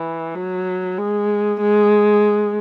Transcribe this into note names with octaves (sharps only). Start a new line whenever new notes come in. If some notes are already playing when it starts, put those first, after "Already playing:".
Already playing: E3
F#3
G#3
G#3